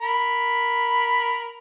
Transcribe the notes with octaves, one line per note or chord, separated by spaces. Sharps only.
A#4 B5